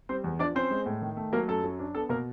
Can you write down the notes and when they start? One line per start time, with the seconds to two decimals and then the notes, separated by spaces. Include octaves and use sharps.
0.09 G3 C4 C5
0.24 E2
0.39 F3 D4 D5
0.55 C4 C#4 C5
0.71 G#3
0.86 A2
1.02 D#3
1.17 A3
1.33 F#3 A#3 A#4
1.48 F#2 A4
1.64 F#3
1.79 D4
1.95 B3 A4
2.09 B2 A#3 A#4